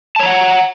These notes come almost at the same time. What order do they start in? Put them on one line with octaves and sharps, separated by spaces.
A5 C#5 A#5 F#5